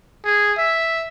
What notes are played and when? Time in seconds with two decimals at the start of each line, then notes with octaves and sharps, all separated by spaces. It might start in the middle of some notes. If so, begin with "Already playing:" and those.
0.25 G#4
0.58 E5